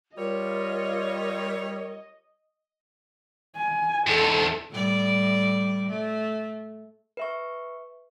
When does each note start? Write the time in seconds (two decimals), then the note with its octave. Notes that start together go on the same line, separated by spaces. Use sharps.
0.17 G3 F4 A#4 C#5 D#5
3.56 G#5
4.07 E2 G#2 A4
4.71 A2 G3 D5
5.89 A3
7.17 B4 E5 C#6